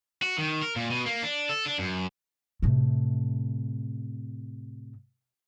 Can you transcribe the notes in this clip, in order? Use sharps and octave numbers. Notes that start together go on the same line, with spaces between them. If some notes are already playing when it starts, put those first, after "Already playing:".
F#4
D#3
A#4
A#2
B2
A#3
D4
A4
D4
F#2
A2 C3